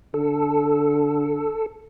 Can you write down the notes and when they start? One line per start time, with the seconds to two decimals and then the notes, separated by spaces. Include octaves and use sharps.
0.14 D3 A4